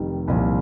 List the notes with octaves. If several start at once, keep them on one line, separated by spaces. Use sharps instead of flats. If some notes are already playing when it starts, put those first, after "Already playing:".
Already playing: F1 F2 D#3 G3
C2 A#2 F3